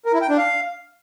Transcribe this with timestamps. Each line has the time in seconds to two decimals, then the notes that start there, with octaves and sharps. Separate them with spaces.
0.06 A#4
0.14 E4
0.21 G5
0.29 D4
0.37 F5